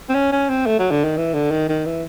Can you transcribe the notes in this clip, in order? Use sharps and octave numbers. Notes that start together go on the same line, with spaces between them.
C4
C#4
C#4
C4
A3
F#3
D3
D#3
E3
D3
D#3
D#3
E3